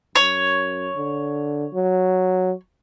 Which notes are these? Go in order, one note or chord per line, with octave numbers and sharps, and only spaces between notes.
F#2 C#5
D3
F#3